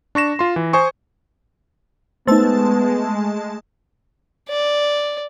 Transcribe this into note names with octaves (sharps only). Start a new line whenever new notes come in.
D4 C#6 A#6 E7
F4 C6
E3
C5 G#5 C#6 D#6
G#3 A3 B3 D#4 C5 A5
D5